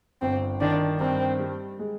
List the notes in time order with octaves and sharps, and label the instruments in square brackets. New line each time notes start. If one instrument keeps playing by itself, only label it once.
[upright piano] G1 [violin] C4
[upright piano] D#3 [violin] D4
[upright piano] G2 [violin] C4
[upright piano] G3
G#3